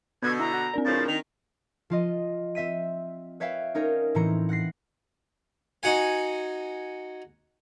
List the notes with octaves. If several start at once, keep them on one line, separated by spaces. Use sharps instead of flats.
B2 D3 B3 E6 G6 G#6
E4 A#5
F#4
C4 D4 A#4 D5
A2 C#3 F3 A6
D#3 F7
F3 F4 D#5
C4 E5 B6 D#7
B4 C#5 E5 F5 G5
C#4 D#4 A#4 C#5
A2 E3 C4 A#5 C#7
F#5 F#6 A#6 C7
D#4 F#4 F#5 G#5